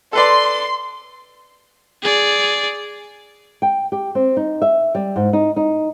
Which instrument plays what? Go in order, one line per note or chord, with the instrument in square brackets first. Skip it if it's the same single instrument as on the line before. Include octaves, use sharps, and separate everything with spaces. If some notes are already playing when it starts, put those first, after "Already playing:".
[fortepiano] A4 B4 D5 [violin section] C6
[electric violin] G#4 D5
[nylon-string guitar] G5
G4
C4
D#4
E5
G3
G#2
D#4
D#4